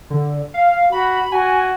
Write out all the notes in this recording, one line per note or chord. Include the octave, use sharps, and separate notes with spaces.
D3
F5
F#4 B5
F#4 G#5